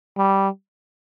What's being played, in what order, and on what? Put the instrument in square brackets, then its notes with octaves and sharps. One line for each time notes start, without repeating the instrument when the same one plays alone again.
[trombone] G3